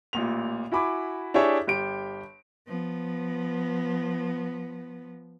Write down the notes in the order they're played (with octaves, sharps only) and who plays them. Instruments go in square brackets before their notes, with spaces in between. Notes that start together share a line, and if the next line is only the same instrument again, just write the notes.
[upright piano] A1 A#2 F7
E4 F#4 G#5 B5 D6
D4 E4 G4 G#4 C#5 E5
G1 G4 G5 D7
[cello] F3 B3